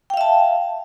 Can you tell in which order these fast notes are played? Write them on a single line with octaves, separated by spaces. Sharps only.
G5 F5 E5 A5